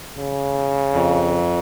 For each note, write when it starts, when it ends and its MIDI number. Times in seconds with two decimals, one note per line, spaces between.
0.16 1.39 49
0.94 1.59 41